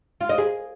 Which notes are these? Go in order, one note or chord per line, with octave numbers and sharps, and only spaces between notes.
F4
D#5
G#4